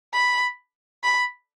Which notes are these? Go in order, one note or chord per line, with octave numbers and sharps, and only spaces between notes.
B5
B5